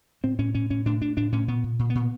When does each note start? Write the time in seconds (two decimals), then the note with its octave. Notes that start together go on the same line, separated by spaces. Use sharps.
0.23 A2 C4
0.39 A2 C#4
0.54 A2 C#4
0.70 A2 C#4
0.86 A2 D4
1.01 A2 D4
1.17 A2 D4
1.32 A2 C#4
1.48 A#2 B3
1.64 A#2
1.79 A#2
1.90 B3
1.95 A#2